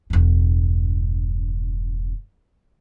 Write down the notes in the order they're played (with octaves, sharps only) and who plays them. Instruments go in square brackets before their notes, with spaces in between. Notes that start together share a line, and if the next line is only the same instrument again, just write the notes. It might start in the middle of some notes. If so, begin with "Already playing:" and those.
[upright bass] E1 G2